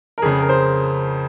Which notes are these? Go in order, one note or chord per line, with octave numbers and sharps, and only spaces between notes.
A#4
F2 C#3 G#4
A#4
C5